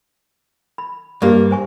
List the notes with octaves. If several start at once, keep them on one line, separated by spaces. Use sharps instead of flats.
B5
G2 A#3 G4 D5
C5 G#5 C#6